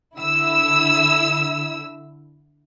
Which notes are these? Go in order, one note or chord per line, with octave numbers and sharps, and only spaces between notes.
D3 E4 E6